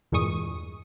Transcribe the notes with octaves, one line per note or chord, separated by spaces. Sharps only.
E2 G2 A#2 G#3 C#6 D#6